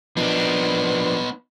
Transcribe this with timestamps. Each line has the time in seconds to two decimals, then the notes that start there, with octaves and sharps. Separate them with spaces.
0.17 F3 B3 D4 D#4 B4